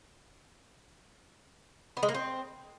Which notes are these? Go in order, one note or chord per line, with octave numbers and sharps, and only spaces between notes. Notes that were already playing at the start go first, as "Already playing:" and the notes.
B3
G#3
A#3
C4